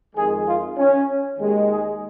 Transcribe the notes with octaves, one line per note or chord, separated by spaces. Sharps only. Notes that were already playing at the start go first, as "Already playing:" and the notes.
F2 D#3 G#3 G#4
F4
C#4
D#2 D#3 G#3
G#4